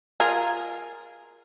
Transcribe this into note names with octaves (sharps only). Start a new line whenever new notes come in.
F4 G#4 A#4